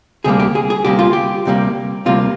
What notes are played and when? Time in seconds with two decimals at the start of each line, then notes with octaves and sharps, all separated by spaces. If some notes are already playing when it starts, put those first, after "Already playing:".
0.24 D2 C3 G3 A#3 G#4
0.40 G4
0.55 G#4
0.70 G#4
0.85 D2 C3 G3 A#3 G4
0.99 F4
1.13 G4
1.45 D2 C3 G3 A#3
2.05 D2 C3 G3 A#3 F4